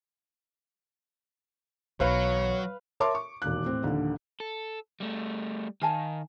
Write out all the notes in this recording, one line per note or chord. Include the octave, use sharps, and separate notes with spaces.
B1 E3 F#3 B4 C#5 F5 B5
A#4 C#5 E5 A5 C6 D6
C#6
E1 D#2 F#6
A2 C4
A#1 D#2 D3
A4
G3 A3
D#3 F5 G#5 A5